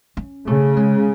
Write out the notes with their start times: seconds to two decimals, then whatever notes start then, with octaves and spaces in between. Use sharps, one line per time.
0.17 C#4
0.46 C#3 A3
0.77 G#3